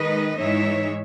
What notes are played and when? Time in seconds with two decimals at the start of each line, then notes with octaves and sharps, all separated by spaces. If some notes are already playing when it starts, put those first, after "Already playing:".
Already playing: D#3 G#3 D#4 B4 D#5
0.38 G#2 E3 G#3 D#4 C#5 E5